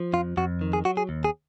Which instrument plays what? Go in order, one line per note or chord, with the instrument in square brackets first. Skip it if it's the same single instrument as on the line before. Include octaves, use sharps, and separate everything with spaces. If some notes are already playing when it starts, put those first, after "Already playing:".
Already playing: [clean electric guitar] F3
F2 F4
F2 F#4
D#3
G#4
F#3 F#4
G#4
D#2
G#4